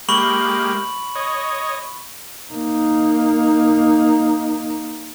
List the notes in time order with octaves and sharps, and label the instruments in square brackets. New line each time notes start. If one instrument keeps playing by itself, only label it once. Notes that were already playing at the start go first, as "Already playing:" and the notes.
[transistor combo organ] G#3 A#3 G4 [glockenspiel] B5 C#6 F#7
[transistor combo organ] C#5 D#5
[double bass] A#3 D#4